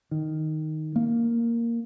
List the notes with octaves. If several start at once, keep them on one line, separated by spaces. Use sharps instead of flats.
D#3
A#3